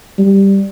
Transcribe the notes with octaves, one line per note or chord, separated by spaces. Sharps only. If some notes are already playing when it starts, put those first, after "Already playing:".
G3